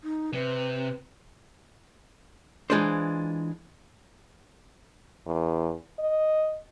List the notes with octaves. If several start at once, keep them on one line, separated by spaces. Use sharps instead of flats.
D#4
C3 B4
E3 G#3 D4 F4 C5
E2
D#5